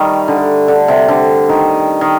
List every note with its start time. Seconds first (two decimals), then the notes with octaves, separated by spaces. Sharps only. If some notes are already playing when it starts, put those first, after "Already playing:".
Already playing: D#3 G3 A3
0.28 D3
0.68 D3
0.88 C3
1.08 D3
1.49 D#3
2.01 D#3